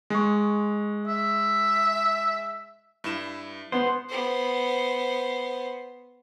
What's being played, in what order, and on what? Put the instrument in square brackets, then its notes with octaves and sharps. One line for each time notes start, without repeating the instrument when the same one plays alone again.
[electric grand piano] G#3 C#6
[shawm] E5
[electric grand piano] G2 E4 E7
[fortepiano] B3 [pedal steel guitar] C5
[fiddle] B3 C5